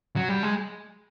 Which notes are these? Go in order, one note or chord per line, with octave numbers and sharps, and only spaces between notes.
F#3
G3
G#3